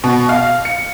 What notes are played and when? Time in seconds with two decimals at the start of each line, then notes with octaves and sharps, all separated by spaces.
0.04 B2
0.29 F5
0.65 C#7